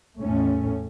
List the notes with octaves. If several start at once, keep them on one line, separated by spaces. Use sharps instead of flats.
E2 A2 A3 C#4